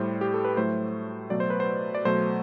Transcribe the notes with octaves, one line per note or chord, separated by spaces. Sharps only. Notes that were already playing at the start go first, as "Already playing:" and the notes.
Already playing: A2 G3 C5
G4
A4
B4
A2 F#3 A3 C5
B2 F#3 A3 D5
C5
B4
C5
D5
B2 F#3 A3 C5